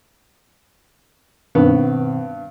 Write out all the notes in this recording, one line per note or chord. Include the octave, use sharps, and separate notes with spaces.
G2 B2 D#3 B3 C4